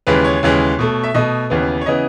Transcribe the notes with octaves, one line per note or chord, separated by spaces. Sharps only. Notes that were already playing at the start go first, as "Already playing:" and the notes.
D#2 C#3 E3 G#3 B4
C#5
D#2 C#3 E3 G#3
B2 A3
E5
B2 A3 D#5
D#2 C#3 E3 B3
C#5
C#3 E3 B3 D#5